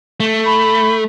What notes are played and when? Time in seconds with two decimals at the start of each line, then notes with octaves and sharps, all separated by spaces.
0.20 A3
0.46 B5